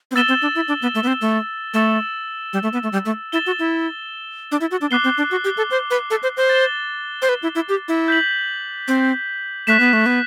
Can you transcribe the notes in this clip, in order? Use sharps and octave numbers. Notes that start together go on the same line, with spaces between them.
C4
B3 E6 A6 E7 G7
C4
D4
E4
D4
B3
A3
B3
C4
A3
A3 E6 A6 E7 G7
G3
A3
B3
A3
G3
A3
E4 A6 E7 G7
F#4
E4
D4
E4
F#4
D4
B3 D6 F#6 C7 G7
C4
D4
F#4
G4
A4
C5
B4
A4
C5
C5
A6 E7 G7
C5
B4
E4
E4
G4
E4
G6 B6 F#7
C4
A3 F#6 B6 E7
B3
A3
B3